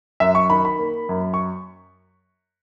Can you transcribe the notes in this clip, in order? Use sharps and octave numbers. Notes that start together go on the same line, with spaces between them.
F#2 E5
C#6
D#3 B5
B5
A#3
F#2
C#6